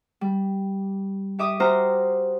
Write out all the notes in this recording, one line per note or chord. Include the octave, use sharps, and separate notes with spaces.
G3
G4 E5 D6 D#6
F#4 G4 C5 A#5 F6